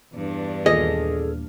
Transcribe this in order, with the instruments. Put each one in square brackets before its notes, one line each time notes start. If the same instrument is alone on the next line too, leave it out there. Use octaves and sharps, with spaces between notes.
[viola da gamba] E2 G2 D4
[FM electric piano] D#2 A#2 F6 [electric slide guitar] G#4 A4 [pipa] D#5